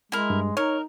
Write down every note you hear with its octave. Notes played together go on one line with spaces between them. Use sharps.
G#3 E4 A#4
G2
D#4 A#4 C#5